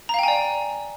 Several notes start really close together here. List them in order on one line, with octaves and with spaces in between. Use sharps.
A#5 F5 G5 G#5 D5